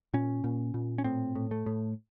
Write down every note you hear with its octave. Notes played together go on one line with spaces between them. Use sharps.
A#2 C#4
A#2
A#2
C#4
A2 C4
A2
A3
A2